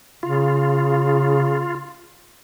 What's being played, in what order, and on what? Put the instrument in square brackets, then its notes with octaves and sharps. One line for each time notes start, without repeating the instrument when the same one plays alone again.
[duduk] C#3 [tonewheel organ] F4